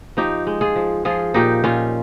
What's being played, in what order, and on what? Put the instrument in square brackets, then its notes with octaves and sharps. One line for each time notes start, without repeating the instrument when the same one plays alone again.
[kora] F3 D#4 G4
G#3
F4 G#4
F3
F3 F4 G#4
A#2 D#4 G4
A#2 C#4 F4